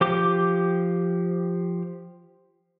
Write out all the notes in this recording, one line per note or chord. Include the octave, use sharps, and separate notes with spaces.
F3 G4 D6